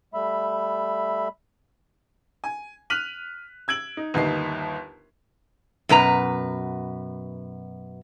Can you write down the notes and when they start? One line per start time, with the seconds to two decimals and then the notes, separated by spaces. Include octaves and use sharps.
0.14 G3 A3 E5 B5
2.44 G#5
2.90 F6 F#6 B6 D#7 F7 F#7
3.68 E6 G#6 D7 F#7
3.97 D#4
4.14 G1 D#2 D#4 C7
5.89 F#2 B2 B4 A#5